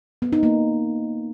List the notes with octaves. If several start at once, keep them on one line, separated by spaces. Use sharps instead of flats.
B3
D#4
A#3